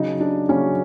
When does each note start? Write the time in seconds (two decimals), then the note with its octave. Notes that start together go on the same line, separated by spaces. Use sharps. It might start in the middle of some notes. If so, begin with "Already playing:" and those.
Already playing: C#3 F#3 D#4
0.20 D4
0.49 C#3 F#3 C#4